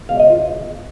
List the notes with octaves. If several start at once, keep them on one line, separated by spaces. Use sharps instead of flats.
C#2 B2 G#3 F5
D#5
F4